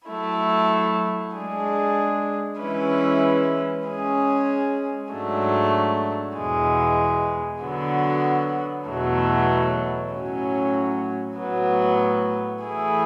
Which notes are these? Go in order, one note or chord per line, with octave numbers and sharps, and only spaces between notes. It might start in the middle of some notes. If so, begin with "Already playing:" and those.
F#3 A3 E4
G#3 D4 G#4
E3 G#3 C#4 E4 B4
G#3 C#4 G#4
G#2 F#3 A3 D4
E2 B2 G#3
D3 F#3 B3 F#4
E2 B2 F#3 A3
A2 F#3 C#4
A2 F#3 B3
E3 A3 E4 G#4